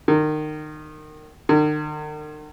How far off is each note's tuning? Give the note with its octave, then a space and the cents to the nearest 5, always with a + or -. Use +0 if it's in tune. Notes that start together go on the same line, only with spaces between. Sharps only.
D#3 -25
D#3 -45